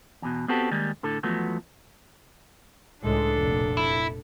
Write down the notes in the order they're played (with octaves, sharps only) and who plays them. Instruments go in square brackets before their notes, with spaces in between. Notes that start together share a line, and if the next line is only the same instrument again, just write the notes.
[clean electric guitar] E2 B2
B3 C4 F#4 G4 A4
D#3 G3 G#3 A#3
A2 D3 A4
E2 F3 F#3 A3 B3
[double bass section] C#2 A2 G#3 [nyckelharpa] D4 A4
[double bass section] F1 A#2
[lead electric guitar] E4